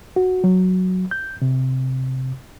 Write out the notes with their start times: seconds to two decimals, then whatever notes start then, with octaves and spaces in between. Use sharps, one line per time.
0.16 F#4
0.44 F#3
1.11 G6
1.42 C3